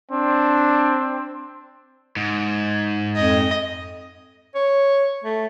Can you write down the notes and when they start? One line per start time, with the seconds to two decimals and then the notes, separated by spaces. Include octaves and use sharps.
0.12 C4 D4
2.16 G#2
3.16 F2 D#5
4.55 C#5
5.24 A3